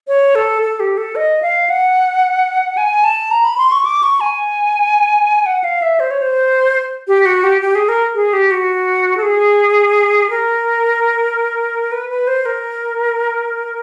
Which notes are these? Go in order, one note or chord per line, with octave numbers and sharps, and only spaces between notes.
C#5
A4
A4
G4
A4
D#5
F5
F#5
G#5
A5
A#5
B5
C6
C#6
D6
C#6
G#5
F#5
F5
E5
C5
C#5
C5
G4
F#4
G4
G4
G#4
A#4
G#4
G4
F#4
A4
G#4
A#4
B4
B4
C5
A#4